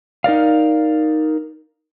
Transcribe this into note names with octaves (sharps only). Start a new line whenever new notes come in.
D#4 A#4 D5 F5